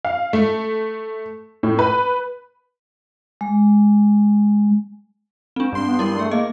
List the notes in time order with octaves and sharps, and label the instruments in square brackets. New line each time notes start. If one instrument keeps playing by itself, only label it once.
[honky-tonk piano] F5
A3
A2
B4
[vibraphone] G#3
[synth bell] C4 D4
[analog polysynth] G2 C6
[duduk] B3
[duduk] G3 [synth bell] E4 A#4
[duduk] A3 [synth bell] G#4
[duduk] A#3 [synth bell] D#5